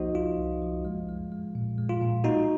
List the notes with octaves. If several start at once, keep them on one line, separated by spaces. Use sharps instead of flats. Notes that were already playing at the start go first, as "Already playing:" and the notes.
Already playing: C2 F3 A#3 D#4 F#4 C5 D#5
C2 F4
C2
F3
G#3
G#3
G#3
A#2
G#3
F4
A#2
A#3 D#4 F#4